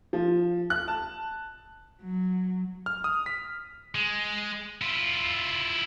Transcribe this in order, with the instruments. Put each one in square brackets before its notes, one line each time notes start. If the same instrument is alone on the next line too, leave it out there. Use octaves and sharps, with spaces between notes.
[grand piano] F3
F#6
A5
[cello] F#3
[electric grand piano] F6
D#6
B6
[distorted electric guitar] G#3
E4 F4